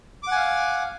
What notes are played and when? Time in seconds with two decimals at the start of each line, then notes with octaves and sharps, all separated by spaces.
0.23 D6
0.27 F#5
0.32 G#5
0.36 F5